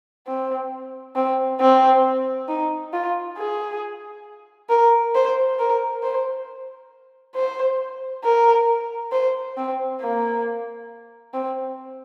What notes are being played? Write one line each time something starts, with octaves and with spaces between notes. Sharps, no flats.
C4
C4
C4
D#4
F4
G#4
A#4
C5
A#4
C5
C5
A#4
C5
C4
A#3
C4